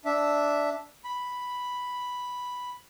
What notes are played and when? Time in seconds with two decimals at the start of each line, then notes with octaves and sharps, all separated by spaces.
0.05 D4 E5
1.04 B5